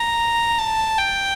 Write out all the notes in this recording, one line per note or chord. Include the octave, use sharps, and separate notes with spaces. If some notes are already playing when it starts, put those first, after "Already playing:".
Already playing: A#5
A5
G5